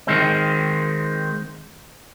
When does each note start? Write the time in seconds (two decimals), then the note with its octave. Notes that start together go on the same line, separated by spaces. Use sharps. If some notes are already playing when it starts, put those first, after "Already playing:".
0.07 D#3 G#3 C4